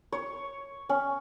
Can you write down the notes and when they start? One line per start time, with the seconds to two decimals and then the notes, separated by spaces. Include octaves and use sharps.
0.12 C#5
0.89 C#4